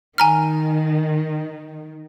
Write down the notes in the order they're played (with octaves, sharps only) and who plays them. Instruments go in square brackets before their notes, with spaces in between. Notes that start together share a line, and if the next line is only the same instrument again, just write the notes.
[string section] D#3 [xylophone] G#5 A#5 F6